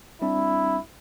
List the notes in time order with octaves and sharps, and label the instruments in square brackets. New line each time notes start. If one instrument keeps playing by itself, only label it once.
[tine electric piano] G3 C4 D4 [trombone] E4